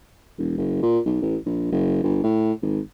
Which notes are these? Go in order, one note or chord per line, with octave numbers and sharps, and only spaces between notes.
E1
F#1
A#2
B1
A1
A#1
F#1
G1
A2
G#1